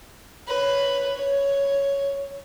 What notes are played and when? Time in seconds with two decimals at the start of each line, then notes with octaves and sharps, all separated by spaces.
0.47 B4 C#5
1.15 C#5